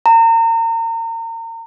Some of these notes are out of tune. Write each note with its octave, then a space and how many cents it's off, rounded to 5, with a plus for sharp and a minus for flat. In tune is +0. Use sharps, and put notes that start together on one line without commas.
A#5 -35